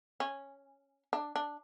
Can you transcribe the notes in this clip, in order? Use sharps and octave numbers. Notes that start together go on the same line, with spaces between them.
C#4
D4
D4